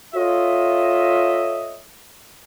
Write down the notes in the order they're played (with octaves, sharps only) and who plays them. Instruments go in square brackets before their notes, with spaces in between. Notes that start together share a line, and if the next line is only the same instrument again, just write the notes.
[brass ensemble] F4 A4 C#5 D#5 E5